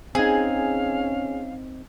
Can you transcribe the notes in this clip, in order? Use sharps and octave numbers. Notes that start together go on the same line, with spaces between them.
C4 C#4 D#4 G#4 F5